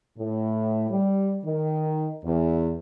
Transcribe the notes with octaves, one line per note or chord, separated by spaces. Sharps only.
A2
G3
D#3
E2